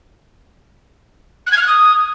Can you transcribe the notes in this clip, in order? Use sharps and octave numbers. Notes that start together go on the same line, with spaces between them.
F#6
G#6
F6
F#6
D#6